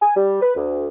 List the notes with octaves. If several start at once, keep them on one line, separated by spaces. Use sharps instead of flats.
G#5
G3
B4
D2